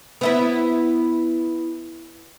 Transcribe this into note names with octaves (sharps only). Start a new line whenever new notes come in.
B3 E4 B4